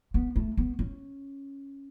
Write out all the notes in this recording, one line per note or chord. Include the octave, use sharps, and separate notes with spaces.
B3
A3
B3
C#4